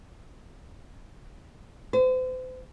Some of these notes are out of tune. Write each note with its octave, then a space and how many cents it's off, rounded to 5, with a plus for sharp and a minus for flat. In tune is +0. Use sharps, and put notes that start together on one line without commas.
C5 -40